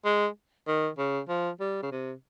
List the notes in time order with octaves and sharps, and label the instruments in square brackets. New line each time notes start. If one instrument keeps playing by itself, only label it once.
[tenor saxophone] G#3
D#3
C#3
F3
G3
C#3
C3